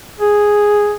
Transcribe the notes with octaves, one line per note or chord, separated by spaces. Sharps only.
G#4